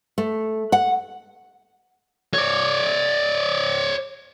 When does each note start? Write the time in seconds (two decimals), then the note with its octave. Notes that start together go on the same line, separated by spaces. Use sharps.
0.18 A3
0.72 F#5
2.34 C#5 D5